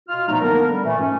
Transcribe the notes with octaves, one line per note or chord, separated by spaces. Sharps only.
B2 F4 F6
A#2 F3 F#3 A3 B3 D#4
D3 A#3 B3 D4 A#4
G3
A#2 E3 A3
G#2 C#4